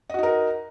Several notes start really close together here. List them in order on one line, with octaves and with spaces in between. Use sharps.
D#5 F#4 D#4 A#4